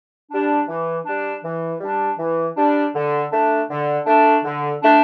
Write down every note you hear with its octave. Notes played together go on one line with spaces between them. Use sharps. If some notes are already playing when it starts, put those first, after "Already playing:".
G3 D4
E3
G3 D4
E3
G3 D4
E3
G3 D4
D3
A3 D4
D3
A3 D4
D3
A3 D4